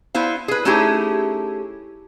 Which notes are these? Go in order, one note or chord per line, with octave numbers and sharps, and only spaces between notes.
B3 E4 C5 F5
G#4 B4
A3 C#4 D#4 E4 G4 G#4